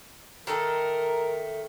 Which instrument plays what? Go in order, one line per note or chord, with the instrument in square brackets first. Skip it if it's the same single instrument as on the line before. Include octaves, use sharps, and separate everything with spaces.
[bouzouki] D#3 A3 A4 [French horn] A#4